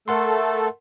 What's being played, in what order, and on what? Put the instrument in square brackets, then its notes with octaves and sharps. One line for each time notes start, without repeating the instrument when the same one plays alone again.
[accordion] A3 A4 [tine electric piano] A#4 F#5 C6